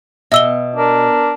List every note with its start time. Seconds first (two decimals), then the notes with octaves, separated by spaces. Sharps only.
0.32 B2 E5 E6 G7
0.76 D4 A#4